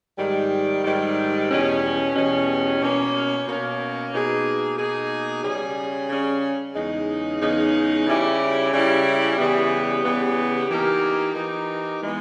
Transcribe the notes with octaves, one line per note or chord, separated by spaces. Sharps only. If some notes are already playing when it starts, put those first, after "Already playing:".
G#2 D#3 G3
G#2 D#3 G3
E2 B2 G3 C#4
E2 B2 G3 C#4
B2 A#3 C#4
B2 A#3 C#4
B2 A#3 D#4 G#4
B2 A#3 D#4 G#4
C#3 G3 C#4 G#4
C#3 G3 C#4 G#4
E2 C#3 G#3 D#4
E2 C#3 G#3 D#4
C#3 G3 C#4 E4 G4
C#3 G3 C#4 E4 G4
C#3 E3 G3 B3 G4
C#3 E3 G3 B3 G4
E3 A#3 D#4 G4 A#4
E3 A#3 D#4 G4 A#4
E3 G#3 B3